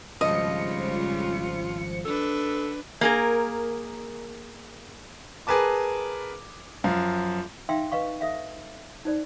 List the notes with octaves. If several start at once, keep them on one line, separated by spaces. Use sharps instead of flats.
G#1 C#3 F3 G3 G#3 F4 D#5 C#7
D4 A4 B4
A#3 G#4 A#4
G#4 A#4 B4 A5 D6
F#2 F3 F5
D#4 E5 F5 G5 C6 E6
B4 D#5 F5 C#6
A4 E5 F5
D#4 C5 D5